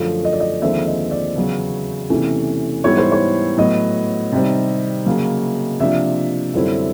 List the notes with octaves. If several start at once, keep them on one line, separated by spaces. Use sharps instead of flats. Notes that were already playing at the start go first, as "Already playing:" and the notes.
Already playing: F#2 D3 F3 A3
D#5
D5
D#5
D#2 D3 F3 G#3 C4 E5
D#5
D5
E2 C#3 F#3 B3
E2 C3 E3 A3 C#4
G#2 E3 G3 B3 E4 C#5
C5
C#5
A2 F#3 B3 D#5
C3 D#3 G3 C4
C#3 F#3 A#3
C3 F3 A#3 D4 E5
F#2 D3 G3 C4 E4